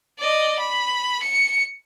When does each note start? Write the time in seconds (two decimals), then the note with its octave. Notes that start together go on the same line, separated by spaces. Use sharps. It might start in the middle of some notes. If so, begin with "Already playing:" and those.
0.19 D5 D#5
0.59 B5
1.22 C#7